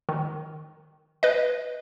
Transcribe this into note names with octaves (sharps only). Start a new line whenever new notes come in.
D#3
B4 D#5